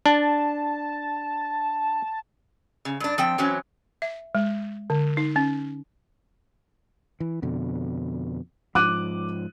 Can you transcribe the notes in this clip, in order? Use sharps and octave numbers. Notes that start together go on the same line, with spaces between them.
D4 A5
C#3
G2 D4
F3 C4 G5
E3 F#3 C4 C#4
E5
G#3
D3
D#4
C#4
E3
F2 B2 D3
G#2 F3 D6 F#6 D#7